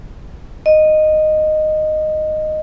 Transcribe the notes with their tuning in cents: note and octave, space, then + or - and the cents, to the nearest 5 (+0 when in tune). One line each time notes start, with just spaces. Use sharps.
D#5 -10